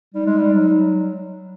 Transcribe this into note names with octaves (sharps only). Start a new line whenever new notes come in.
G3 D#4
G#3
G3
F#3